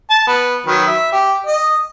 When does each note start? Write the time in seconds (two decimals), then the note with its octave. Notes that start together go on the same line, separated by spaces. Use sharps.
0.10 A5
0.27 B3
0.67 D#3 F#3 B4
0.87 E5
1.12 G4
1.46 D#5